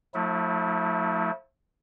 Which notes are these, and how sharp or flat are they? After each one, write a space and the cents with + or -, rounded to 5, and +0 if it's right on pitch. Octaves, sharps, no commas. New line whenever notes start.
F3 +40 A3 +10 E4 -30